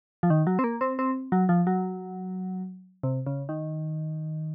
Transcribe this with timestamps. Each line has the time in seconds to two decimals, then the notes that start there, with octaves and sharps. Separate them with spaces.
0.23 F3
0.30 D#3
0.47 F#3
0.59 C4
0.64 A#3
0.81 C4
0.99 C4
1.32 F#3
1.49 F3
1.67 F#3
3.03 C3
3.26 C#3
3.49 D#3